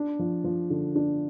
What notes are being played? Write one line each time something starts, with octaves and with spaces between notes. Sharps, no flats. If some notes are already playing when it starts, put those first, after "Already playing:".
Already playing: D4
F3
F3
D3
D4